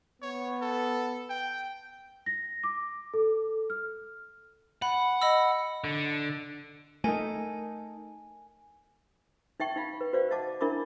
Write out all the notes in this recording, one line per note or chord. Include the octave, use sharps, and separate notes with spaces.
B3 C#5
A4
G5
A#6
D6
A4
F6
F#5 B5
D#5 B5 E6
D3
A3 D#4 A4 A#4 G#5
D#4 E5 G5 C#6
D#4 F5 B5
B4
F#4 B4 C5 D5 F5
D#5 E5 F#5 A5 D6
D4 E4 A#4 E5 B5 D6